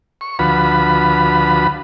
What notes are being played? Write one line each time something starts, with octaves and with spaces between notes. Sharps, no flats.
C#6
D2 F3 F#4 B4 B5